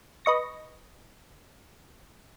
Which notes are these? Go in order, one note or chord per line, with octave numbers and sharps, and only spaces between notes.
B4 D#5 C#6 A#6